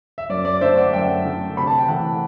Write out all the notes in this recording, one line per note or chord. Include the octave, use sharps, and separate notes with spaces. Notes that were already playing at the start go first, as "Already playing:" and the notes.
E5
F#2 D5
D5
D3 A3 C5 E5
D5 F#5
F#2 E5 G5
D3 A3
C3 B5
A5
G5
E3 A3 F#5 A5